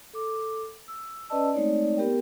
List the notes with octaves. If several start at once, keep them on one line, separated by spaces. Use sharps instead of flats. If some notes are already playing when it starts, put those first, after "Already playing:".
A4 D6
E6
C#4 B4 D5 D#5 A5 E6
G#3 A3 C4 D#4 C#5 D5
B3 G4 A#4 G5